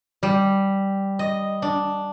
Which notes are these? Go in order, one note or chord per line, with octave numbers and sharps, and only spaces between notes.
G3
D#5
D4